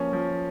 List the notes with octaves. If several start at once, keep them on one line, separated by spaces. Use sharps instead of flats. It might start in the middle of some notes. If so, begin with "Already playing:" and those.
Already playing: F3 A#3 C#4
F3